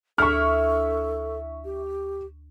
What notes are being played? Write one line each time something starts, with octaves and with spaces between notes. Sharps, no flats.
D2 D4 E4 A4 E5 C#6 F6
G4